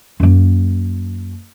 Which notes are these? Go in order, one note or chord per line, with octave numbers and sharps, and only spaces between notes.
F#2 A#3